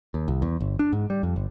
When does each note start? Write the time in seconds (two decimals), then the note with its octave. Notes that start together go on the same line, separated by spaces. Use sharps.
0.14 D#2
0.28 C2
0.42 E2
0.60 G1
0.79 D4
0.93 G#2
1.10 G3
1.23 F2
1.36 G1